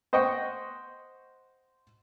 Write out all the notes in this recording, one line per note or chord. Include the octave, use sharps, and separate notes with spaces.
C5 D#5 F#5 G5 C#6